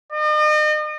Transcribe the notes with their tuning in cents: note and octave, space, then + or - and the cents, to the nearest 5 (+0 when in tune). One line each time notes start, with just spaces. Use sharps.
D#5 -40